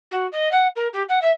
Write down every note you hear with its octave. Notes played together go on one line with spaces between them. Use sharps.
F#4
D#5
F#5
A#4
G4
F#5
E5